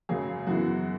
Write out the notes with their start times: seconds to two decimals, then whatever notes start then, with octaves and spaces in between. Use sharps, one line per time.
0.09 F#2 C#3 F#3 A#3 G#4
0.47 F#2 E3 B3 F#4